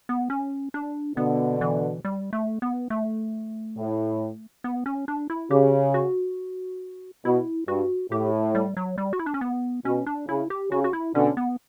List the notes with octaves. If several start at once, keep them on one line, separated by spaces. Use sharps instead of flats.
B3
C#4
D4
B2 D3 B3
E3
G3
A3
B3
A3
A2
B3
C#4
D4
E4
C#3 G4
F#4
B2 E4
G2 F#4
A2 G4
G3
F#3
G3
F#4
E4
D4
C#4
B3
B2 C#4
D4
C#3 E4
G4
C#3 F#4
F#4
E4
B2 D3 C#4
B3